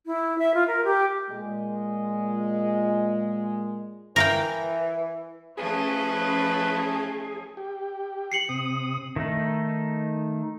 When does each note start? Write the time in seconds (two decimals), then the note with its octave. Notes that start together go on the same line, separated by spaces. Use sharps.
0.06 E4
0.39 E5
0.54 F4
0.67 A#4
0.85 G4
1.30 A#2 G#3
4.16 E3 A#4 F5 G5
5.57 F3 A3 C#4 E4 G#4 B4 D#5
7.57 G4
8.32 C7 C#7 F#7
8.49 C3 D#6
9.16 D#3 A3 D#4